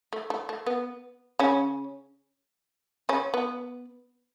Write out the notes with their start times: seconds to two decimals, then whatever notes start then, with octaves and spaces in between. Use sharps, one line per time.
0.13 A3
0.30 A3
0.49 A3
0.66 B3
1.39 C#3 C#4
3.09 C#3 C#4
3.34 B3